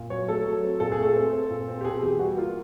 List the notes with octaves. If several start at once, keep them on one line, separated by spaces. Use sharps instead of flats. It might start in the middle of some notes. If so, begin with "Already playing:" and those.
Already playing: A#2
F#3 C#5
A3 A4
F#3
C4
A#2 A4
G#4
A3 A4
C4
C4
A#2
C4
G4
B2 G#4
E2 G4
G3 F#4
A#3 F4